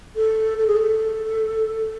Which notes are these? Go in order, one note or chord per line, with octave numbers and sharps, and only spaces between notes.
A4
A4
G#4
A4